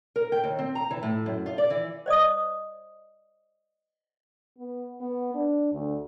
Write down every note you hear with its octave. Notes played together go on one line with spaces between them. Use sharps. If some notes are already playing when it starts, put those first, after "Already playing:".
A#4
G5
D#2
C4
A#5
E3
A2
F#2
F4
D5
E3
C5 D5 D#5 D#6
B3
B3
D4
D2